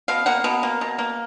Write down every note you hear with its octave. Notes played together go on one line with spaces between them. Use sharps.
B2 F5
A#3 F#5
B2
A#3
B2
A#3